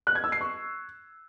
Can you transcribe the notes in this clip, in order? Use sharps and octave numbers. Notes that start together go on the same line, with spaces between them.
F#6
G#6
E6
C7
C#6